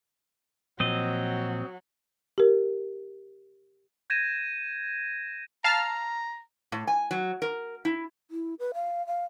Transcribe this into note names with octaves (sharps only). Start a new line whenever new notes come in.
A#2 F3 F#3 C4 D#5
G4 A#4
G6 G#6 A#6 D#7 E7
F5 A5 A#5 F6
A2
G#5
F#3
A#4
E4
E4
B4
F5
F5